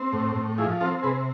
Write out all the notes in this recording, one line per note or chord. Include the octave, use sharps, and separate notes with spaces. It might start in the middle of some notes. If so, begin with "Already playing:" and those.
Already playing: C4
A2
A2
F3 E4 G#4
C4 F4 A4
C3 G#4 B4